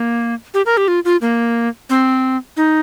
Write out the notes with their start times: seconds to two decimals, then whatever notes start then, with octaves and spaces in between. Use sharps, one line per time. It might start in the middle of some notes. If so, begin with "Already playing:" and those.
Already playing: A#3
0.54 G4
0.66 A#4
0.77 G4
0.88 F4
1.05 F4
1.21 A#3
1.90 C4
2.57 D#4